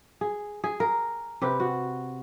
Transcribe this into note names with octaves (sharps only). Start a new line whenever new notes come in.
G#4
G#4
A#4
C3 G4 B4
F#4